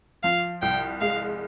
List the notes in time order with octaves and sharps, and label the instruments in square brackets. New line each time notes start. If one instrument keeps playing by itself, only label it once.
[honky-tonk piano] F3 [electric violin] F5
[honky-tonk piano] C2 [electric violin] G5
[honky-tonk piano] G#3 [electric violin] F5